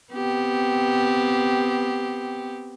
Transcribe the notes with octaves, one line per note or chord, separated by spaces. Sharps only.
B3 C4 G4